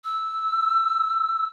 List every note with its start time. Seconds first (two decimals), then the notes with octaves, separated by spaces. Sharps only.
0.04 E6